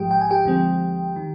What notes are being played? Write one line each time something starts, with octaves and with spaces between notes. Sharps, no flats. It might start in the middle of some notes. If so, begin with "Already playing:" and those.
Already playing: G#1 G#2 F3 G#3 G4 G5
G5
G#5
G4 G5
D2 D3 F3 G#3 C4
D#3